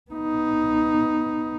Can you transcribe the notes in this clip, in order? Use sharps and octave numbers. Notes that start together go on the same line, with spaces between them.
B3 D#4